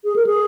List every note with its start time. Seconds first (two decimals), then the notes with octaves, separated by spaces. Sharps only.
0.04 G#4
0.16 A#4
0.27 G#4